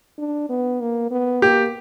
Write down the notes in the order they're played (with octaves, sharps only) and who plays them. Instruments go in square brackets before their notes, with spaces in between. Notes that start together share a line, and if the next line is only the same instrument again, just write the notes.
[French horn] D4
B3
A#3
B3
[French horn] A#3 [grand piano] G4